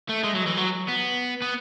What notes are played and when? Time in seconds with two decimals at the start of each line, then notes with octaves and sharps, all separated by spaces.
0.09 A3
0.24 G#3
0.35 F#3
0.46 E3
0.57 F#3
0.88 B3
1.42 B3